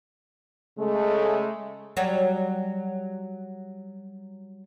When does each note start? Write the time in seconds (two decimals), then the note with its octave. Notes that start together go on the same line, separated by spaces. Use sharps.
0.78 C#3 G#3 A3
1.97 F#3 G3